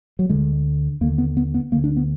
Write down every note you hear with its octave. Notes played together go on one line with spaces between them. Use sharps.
F#3
D2 D3 G#3
D#2 D3 A#3
B3
B3
B3
D2 D3 A#3
D4
B3